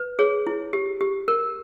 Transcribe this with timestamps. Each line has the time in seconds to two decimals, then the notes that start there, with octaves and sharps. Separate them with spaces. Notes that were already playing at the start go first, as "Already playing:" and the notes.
Already playing: B4
0.19 G#4 C#5
0.47 E4
0.73 G4
1.01 G4
1.28 A#4